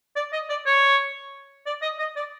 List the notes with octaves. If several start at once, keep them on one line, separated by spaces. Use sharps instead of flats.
D5
D#5
D5
C#5
D5
D#5
D#5
D5